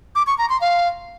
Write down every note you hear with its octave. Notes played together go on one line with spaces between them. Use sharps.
D6
C#6
A#5
C6
F5